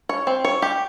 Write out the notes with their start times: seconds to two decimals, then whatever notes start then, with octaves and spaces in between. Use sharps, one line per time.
0.09 C#5
0.27 C4
0.45 C#5
0.62 G4